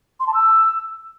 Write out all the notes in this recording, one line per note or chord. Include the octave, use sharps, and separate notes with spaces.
C6
A5
E6